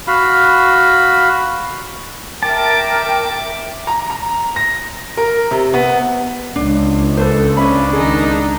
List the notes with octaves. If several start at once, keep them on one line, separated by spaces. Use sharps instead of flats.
F#4 F5 B5
A#4 E5 G5 A5 D6
A#5
A#5
A#6
A#4
C3
B3
C#2 D4
A4 B4 C5
C#3 C#4 D4 E5 B5
D#3 D#4 G#4